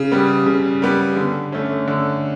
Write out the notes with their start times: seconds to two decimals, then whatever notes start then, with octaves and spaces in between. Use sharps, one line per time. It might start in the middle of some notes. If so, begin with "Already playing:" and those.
Already playing: C#3
0.12 G3 B3
0.46 C#3
0.82 G3 B3
1.16 D3
1.52 A3 C#4
1.88 D3